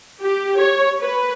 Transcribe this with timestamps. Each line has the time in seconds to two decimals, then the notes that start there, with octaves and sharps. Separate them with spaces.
0.22 G4
0.59 C#5
1.01 B4